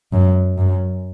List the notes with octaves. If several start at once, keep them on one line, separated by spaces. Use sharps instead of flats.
F#2
F#2